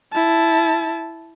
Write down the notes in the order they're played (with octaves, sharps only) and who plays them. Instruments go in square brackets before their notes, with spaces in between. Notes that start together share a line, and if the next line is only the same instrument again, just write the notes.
[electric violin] E4 A5